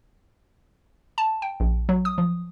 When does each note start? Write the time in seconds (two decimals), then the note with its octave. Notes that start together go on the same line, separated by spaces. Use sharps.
1.18 A5
1.42 G5
1.60 A#1
1.89 F#3
2.05 D#6
2.18 F3